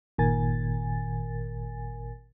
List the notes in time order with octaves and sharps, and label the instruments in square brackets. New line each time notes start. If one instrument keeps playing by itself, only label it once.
[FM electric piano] G1 A#2 D#3 A#4 G#5 A6